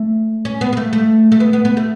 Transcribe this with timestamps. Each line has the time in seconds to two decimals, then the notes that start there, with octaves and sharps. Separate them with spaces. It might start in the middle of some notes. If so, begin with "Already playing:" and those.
Already playing: A3
0.45 C#4
0.61 B3
0.73 B3
0.77 A3
0.93 A3
1.32 A3
1.40 B3
1.53 B3
1.65 B3
1.77 A3